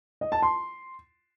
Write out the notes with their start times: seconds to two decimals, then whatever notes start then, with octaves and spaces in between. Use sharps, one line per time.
0.21 D#5
0.32 A5
0.42 C6